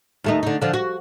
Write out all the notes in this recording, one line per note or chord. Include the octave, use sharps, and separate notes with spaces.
D#2 A3 D#4
D3 D#4
D3 F3
F#4